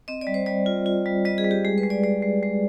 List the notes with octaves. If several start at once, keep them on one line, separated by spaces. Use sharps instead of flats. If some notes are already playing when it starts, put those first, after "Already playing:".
C4 D#5
D5
G3
C5
G3 D5
F4
F4
G3
G3 D#5
G#4
G3
G4
G#3 G#4
B4
G#3
D5
G#3 D5
G#3
G#3